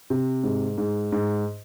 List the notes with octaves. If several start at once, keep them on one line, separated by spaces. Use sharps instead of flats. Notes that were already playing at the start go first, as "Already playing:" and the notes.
C3
G#2
G#2
G#2